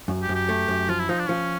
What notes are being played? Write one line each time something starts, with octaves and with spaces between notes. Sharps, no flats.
F#2
G4
F#2
G4
A3
F#2
F3 F4
E4
F3 D#4
D4
F3 C#4